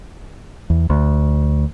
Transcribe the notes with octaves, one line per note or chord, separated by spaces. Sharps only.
E2
D2